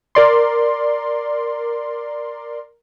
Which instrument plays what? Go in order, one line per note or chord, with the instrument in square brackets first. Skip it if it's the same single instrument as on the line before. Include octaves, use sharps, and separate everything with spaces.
[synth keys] A#4 D5 C6